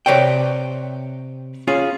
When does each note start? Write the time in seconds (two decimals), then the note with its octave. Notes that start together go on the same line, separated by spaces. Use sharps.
0.06 C3 B4 C#5 D5 G5
1.67 C#4 F4 G#4